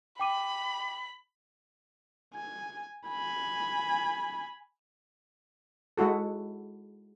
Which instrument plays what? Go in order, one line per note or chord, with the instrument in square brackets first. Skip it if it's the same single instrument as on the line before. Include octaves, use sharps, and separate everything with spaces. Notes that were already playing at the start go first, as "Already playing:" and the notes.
[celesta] G5 D6 D#7 [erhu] B5
[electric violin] G#5
G#5 B5
[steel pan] G#3 E4 F#4 A4